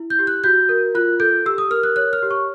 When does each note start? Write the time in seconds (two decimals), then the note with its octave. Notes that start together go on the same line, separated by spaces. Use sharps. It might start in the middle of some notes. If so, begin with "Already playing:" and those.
Already playing: E4
0.10 G6
0.19 G4
0.27 F#6
0.44 F#4 G6
0.69 A#4
0.95 F4 F#6
1.20 A4 G6
1.46 G4 E6
1.58 D#6
1.71 A#4 F6
1.83 F#6
1.96 C#5 F#6
2.13 F6
2.23 G4
2.31 C#6